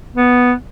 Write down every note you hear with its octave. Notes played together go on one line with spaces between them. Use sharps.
B3